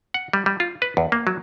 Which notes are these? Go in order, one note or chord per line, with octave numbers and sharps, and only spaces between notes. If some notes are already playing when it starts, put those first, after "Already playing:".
F#5
G3
G3
F4
B4
E2
A#3
F#3